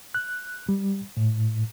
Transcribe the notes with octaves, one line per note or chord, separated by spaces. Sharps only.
F#6
G3
A2